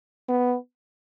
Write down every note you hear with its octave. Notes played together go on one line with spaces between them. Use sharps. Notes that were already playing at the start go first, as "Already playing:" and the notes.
B3